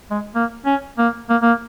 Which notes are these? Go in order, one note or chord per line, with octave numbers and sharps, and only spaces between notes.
G#3
A#3
C#4
A#3
A#3
A#3